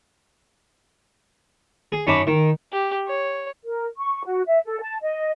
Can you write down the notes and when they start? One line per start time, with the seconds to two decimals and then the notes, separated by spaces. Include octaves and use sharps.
1.92 G#4
2.07 F#2 C#4 D#4 A5 B5 D6
2.27 D#3
2.73 G4
3.07 C#5
3.64 A#4
3.97 C#6
4.25 F#4
4.47 E5
4.65 A4
4.81 A5
5.01 D#5